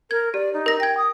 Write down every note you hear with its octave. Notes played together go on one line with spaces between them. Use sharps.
A#4 G#6
G4 D5
D#4
A#4 A#6
G5 G#6 A#6
D#6